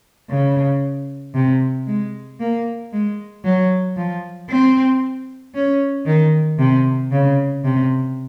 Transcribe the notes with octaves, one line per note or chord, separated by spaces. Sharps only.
C#3
C3
G#3
A#3
G#3
F#3
F3
C4
C#4
D#3
C3
C#3
C3